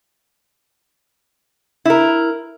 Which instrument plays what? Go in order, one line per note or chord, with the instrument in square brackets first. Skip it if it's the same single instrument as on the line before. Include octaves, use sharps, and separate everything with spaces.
[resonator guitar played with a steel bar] E4 A#4